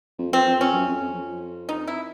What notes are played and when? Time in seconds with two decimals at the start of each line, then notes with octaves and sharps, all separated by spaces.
0.19 F2
0.32 F2 C4
0.47 F2
0.60 F2 C#4
0.74 F#2
0.88 F2
1.01 F2
1.14 F2
1.69 D#4
1.88 E4